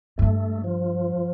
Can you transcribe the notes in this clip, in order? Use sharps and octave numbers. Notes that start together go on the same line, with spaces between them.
G2 A3
F3